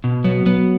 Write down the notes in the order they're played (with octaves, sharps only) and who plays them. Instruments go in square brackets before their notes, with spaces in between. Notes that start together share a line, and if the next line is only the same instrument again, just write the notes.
[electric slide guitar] B2
[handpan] F#3 [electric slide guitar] B3
[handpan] F#3 [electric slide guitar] B3